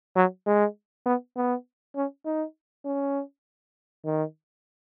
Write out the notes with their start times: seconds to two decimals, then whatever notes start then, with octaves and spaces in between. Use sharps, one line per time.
0.16 F#3
0.46 G#3
1.06 B3
1.36 B3
1.96 C#4
2.25 D#4
2.85 C#4
4.05 D#3